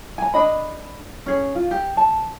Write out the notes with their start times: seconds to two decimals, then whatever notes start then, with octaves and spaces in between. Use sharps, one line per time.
0.18 G#5 A#5
0.34 D4 D#5 B5
1.26 C#4 G#4
1.55 F4
1.71 G4
1.97 A5